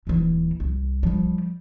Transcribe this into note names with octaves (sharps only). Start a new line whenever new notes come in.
D#1 E3
C2
F3 G3